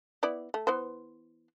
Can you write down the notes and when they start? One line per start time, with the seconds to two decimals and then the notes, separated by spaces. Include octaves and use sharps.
0.23 B3 E4 D5
0.54 A3
0.67 E3 B3 C5